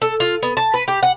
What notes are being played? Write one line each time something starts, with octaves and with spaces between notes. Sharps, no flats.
A4
F4
B3
A5
B4
G4
F#5